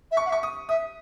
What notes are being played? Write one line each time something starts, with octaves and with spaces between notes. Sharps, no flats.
E5
C#6
F#5
E5
C#6
D#6
E5 D#6